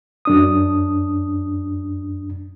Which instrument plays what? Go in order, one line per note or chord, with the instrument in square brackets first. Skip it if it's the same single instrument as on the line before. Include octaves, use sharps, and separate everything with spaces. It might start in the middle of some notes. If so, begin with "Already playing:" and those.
[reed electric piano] F#2 D4 D#6